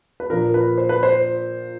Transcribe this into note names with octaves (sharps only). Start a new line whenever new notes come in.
B4
A#2 F3 A#3 D4 A#4
B4
C5
B4
C5